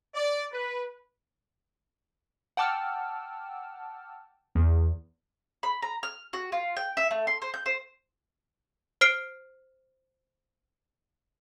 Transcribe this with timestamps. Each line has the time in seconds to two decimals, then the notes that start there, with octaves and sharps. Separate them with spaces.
0.14 D5
0.52 B4
2.57 F#5 G5 A5 D6 E6 F6
4.55 E2
5.63 B5
5.82 A#5
6.03 F6
6.33 F#4
6.52 F4
6.77 G5
6.97 E5
7.11 A3
7.27 C6
7.42 C5
7.54 G6
7.66 C5
9.01 C5 F6 C7 D7